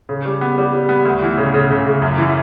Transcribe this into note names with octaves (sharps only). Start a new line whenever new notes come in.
C#3
G3
B3
G3
G3
B3
D2
E3
C#3
C#3
C#3
C#3
F#2
E3